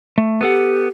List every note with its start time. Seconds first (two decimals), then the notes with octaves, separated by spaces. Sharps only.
0.18 A3
0.41 B3 G4 A4 F#5